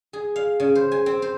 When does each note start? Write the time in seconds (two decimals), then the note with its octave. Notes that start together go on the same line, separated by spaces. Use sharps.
0.13 G#4
0.36 F5
0.60 C#3
0.75 C5
0.92 G#5
1.06 C4
1.22 C5